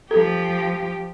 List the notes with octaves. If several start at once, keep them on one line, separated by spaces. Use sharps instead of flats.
F3 G4 A4